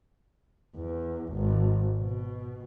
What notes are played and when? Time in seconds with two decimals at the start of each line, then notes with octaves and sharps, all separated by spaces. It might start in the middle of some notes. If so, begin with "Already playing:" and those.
0.76 E2
1.34 G#1
1.99 B2